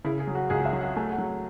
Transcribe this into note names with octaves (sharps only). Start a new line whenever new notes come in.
C#3 E4
G#4
F#3
F#4
C#2 G#4
E5
F#3
F#5
A3 G#5
F#5
F#3